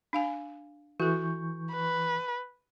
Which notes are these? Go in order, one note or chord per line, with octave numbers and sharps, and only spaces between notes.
D4 F5 G#5
E3 F#4 A4 C#6 G6
B4